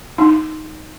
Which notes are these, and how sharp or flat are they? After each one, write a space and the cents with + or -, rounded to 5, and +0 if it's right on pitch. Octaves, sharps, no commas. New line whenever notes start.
D#4 +5